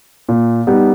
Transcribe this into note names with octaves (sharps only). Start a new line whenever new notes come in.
A#2
G3 B3 D#4 G4